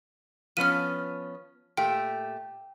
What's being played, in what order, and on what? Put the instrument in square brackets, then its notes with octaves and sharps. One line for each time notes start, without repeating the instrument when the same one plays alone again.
[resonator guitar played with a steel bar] F3 B3 C#4 [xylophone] F6 D#7
[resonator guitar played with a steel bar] A#2 A3 G4 [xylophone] G5